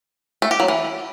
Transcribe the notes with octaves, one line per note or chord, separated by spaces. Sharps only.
A3
G4
F#3
E3